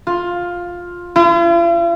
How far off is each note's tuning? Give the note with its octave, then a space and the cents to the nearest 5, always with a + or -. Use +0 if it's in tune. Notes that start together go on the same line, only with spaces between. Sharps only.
F4 +10
F4 -45